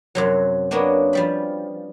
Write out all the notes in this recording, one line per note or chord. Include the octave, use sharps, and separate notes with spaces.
F#2 C3 F#3
A#3 B3 C#4 D4 F#4
F3 G3 B5